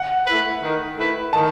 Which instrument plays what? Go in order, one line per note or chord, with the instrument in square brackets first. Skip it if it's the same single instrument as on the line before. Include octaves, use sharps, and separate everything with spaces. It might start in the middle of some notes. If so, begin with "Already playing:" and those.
Already playing: [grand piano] F#5
[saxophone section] A3 E4 B4
D#3
A3 E4 B4
[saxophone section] D#3 [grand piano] A5